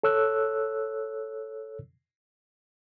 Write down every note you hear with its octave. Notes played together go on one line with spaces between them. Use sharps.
A4 C#5 E6 F#6